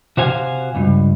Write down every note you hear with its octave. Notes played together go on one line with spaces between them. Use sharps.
C3 F#4 C5 F5 G#5
C#2 G2